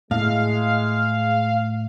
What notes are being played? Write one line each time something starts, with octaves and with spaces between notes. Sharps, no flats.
A2 G#3 F5